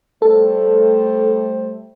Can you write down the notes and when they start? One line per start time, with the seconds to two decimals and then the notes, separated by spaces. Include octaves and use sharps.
0.22 G3 A3 A4 C5